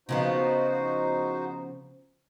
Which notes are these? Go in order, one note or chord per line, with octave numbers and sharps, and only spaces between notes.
C#3 F3 B3 D#4 F#4 C5